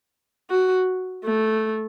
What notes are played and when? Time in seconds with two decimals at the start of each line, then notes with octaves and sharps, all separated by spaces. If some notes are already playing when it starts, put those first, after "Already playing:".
0.50 F#4
1.25 A3